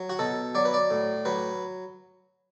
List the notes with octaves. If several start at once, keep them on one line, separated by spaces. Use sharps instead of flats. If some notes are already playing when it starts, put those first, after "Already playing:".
Already playing: F#3
F#4
B2 A4
F#3 D5
B4
D5
A2
F#3 B4